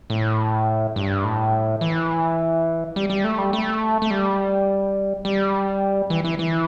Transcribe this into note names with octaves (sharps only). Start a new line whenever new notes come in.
A2
G2
A2
E3
G3
G3
A3
G3
A3
A3
G3
G3
E3
E3
E3